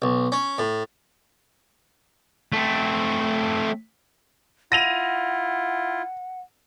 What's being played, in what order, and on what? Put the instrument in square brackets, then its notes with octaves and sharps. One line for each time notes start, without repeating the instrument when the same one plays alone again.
[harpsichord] B1
C#4
A2
[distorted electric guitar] A3 C4
[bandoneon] E4 F4 [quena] F#5 [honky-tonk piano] A#6 D#7 F7